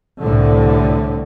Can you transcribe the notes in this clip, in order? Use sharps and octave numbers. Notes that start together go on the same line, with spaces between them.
C2 A2 D3